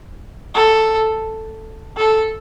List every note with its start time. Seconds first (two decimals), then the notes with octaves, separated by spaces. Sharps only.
0.55 A4
1.97 A4